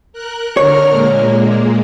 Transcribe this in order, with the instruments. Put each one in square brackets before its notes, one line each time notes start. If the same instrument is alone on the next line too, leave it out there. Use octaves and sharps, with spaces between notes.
[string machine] A#4 F#6
[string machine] D3 A#4 F6 [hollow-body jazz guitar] C#5
[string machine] A#2 G#3 A#3